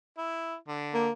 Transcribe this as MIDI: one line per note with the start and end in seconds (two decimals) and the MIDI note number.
0.18 0.55 64
0.68 1.07 50
0.94 1.11 58